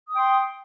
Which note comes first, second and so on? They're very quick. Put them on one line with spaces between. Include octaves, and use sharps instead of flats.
D#6 G5 C6